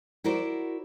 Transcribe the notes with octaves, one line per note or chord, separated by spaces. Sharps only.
E4 F#4 A#4 C5 D5